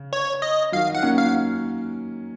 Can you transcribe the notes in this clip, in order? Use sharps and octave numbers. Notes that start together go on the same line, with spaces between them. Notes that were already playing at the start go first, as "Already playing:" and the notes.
Already playing: C#3
C#5
D#5
D#3 F#3 F5
F#5
A#3 C#4
F5